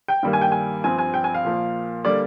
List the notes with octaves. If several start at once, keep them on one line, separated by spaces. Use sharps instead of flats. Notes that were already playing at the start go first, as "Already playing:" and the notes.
G5
G2 D#3 G3 A#3
G#5
G5
G#5
G2 F3 C4 G#5
G#5
G5
G#5
F5
A#2 F3 A#3
D3 G3 A#3 D5